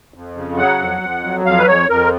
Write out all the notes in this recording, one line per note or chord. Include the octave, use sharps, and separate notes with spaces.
F2
C#3
F#3 F#5
F2
F2
F#3
F2 F5
B4
F2 C#5
F2 A#4